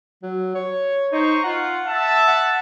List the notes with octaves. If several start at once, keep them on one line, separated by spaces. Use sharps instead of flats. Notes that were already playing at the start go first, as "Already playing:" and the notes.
F#3
C#5
D#4 C5 A#5 C#6
F4 F#5
E5 A5
F#5